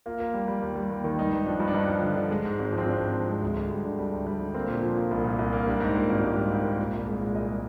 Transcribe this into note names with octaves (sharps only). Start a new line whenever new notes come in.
A#3 F4
A#3
G3
G3
D#2
G3
D#2
D#3
G2 D#4
G2
F3 D4
G2
D4
G2 D#4
F3
D3
D3
G#3
G#2
G#1
F3
C4
G#1 D4
G#1
F3
G#3
D2
D2
G3
D3
G3
D2
G3
D3
A#3 C4
A#2
F3
A#3
C2
A#2
C2
A#3
G3 D4
G#2 D#4
A#3 F4
G#1
F4
G#2 G4
G3
G#2
A#3
A#2
C2
G#3
A#2
C2 D#5
G#3